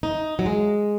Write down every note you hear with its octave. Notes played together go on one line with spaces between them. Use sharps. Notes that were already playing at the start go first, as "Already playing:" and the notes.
D#4
F#3
G#3